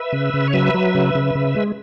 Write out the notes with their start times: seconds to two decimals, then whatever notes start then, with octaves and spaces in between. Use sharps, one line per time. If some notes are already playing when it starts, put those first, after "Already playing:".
Already playing: B4 E5
0.13 C#3
0.34 C#3
0.48 C#5
0.53 F#3 B4 E5
0.74 F#3
0.95 C#3
1.15 C#3
1.35 C#3
1.56 G#3